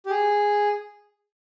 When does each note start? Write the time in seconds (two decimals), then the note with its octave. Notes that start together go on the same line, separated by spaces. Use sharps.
0.06 G4
0.10 G#4